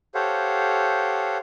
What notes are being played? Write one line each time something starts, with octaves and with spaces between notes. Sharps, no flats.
G4 A4 C5 C#5 F5 F#5